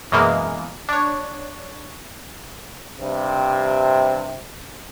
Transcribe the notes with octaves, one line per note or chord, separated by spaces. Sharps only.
F#2 B2 E3 G#3 A#3
D4 C#5
G2 C3